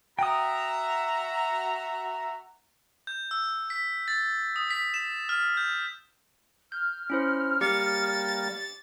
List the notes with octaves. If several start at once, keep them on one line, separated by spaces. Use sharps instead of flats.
F#4 E5 G5 A#5 D#6
G6
E6
B6
A6
D#6
B6
E7
F6
G6
F6 G6
C#4 E4 C5
G3 A#3 G4 A6 C#7